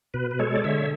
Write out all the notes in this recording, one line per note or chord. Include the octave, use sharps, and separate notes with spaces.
B2 B4
B4
G#3 A4 C#5
D5
D3 C#5 E5